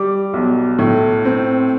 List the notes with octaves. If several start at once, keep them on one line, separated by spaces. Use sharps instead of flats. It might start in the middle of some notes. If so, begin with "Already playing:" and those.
Already playing: G3 D6
B1
A2
C4